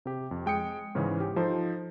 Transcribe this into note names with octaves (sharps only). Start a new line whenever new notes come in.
C3 G4
F2
G#3 G5 D#6 C#7
G#2 C#3 E3 C#4
G4
F3 D#4 A4 C5